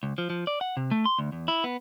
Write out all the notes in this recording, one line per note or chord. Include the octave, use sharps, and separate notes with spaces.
C#2
F3
F3
D5
F#5
C3
A3
C6
D2
E2
E4
B3